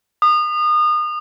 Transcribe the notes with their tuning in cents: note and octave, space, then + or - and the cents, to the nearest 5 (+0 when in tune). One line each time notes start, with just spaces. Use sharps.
D#6 -30